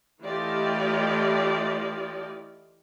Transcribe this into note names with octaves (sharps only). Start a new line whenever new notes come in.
E3 A3 F4 G4 D5 D#5